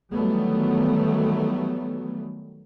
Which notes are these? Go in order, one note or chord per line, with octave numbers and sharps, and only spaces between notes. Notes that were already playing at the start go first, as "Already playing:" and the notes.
D#3 E3 F#3 G3 A3 B3